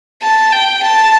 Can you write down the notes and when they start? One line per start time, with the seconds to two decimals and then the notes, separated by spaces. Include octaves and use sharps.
0.23 A5
0.53 G5
0.83 A5